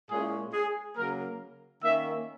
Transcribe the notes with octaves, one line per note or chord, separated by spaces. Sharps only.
A#2 G#3 C#4 E4 G#4
G#4
C#3 F#3 A#3 A#4
D#3 A#3 C#4 E5